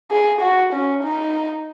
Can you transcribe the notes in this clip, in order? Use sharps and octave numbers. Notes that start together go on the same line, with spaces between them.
G#4
F#4
C#4
D#4